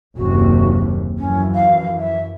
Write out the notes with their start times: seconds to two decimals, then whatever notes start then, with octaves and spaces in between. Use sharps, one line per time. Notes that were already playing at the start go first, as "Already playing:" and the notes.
0.17 F#1 D#2 C3 F#4
1.18 F#2 E3 F3 C#4
1.55 F5
1.98 E5